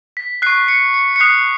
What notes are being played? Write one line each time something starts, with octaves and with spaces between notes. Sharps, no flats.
B6
C#6 F#6 C7
C#7
C#7
C#7
D#6 F#6 C7